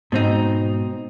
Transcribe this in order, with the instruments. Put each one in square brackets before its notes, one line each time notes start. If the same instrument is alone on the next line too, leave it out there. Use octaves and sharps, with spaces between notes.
[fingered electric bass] G#2 [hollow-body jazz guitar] B2 C4 D#4